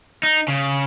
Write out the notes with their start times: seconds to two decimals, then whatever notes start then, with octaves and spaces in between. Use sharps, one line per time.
0.23 D#4
0.48 C#3